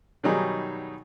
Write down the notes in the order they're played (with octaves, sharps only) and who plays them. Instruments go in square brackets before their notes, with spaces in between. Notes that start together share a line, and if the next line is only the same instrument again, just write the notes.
[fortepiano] B2 D#3 F#3 G3 D#4 G#4